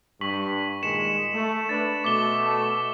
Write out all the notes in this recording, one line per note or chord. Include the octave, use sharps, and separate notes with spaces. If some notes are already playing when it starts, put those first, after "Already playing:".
G2 C#6 B6 F#7
A#2 D#3 G#3 C#7 E7
A3
A3 D4 B4 A6
B2 A3 D6 A6 G7